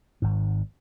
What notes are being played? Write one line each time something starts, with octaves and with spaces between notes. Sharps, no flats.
G#1 G#2